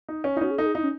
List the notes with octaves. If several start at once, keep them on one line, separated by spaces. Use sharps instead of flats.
D#4
C#4
D#4 E4
C#4 F#4
G#4
D#4 A4
G#4
D#4 E4
C#4